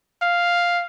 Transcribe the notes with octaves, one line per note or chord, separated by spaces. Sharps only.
F5